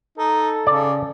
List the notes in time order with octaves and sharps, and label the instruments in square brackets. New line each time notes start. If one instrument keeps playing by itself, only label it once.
[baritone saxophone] D#4 [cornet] A4
[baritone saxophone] C#3 [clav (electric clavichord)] D5